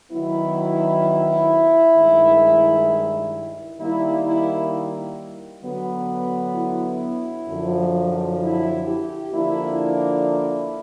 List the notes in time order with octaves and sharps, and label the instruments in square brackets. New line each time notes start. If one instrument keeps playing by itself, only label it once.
[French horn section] D#3 F#3 B3 E4
G2 D#3 G#3
D#3 G3 A#3 E4
E4
D3 F#3 B3
E4
F#2 D3 F3
E4
G4
D3 F3 A#3 D4 E4
E4